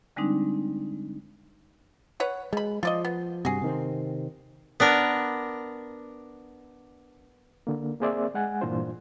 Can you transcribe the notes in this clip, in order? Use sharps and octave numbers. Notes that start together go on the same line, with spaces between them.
D3 G3 G#3 C4 D4 D#4
B4 C#5 F#5
B2 G#3 B5
F3 F4 D5 D#5
B3
G2 C3 F#4 G#4
C3 D#3 C4
B3 D4 A#4
D3 A#3
A#3 C4 G#4 C5 D5 E5
G#3 F#5 G#5
G2 A#2 E3 D4 F4 C5